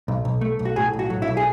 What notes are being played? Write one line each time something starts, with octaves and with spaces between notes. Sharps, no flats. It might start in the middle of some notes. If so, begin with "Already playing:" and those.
B1
B1
A3
B1
F#4
A2 G#4
B1
F#4
F#3
E4
B1
G#4